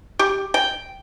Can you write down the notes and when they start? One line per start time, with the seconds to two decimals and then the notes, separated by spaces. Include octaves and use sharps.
0.19 G4
0.54 G5